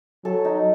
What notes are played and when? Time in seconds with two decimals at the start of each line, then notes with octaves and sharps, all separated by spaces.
0.25 F#3 A4
0.45 D#4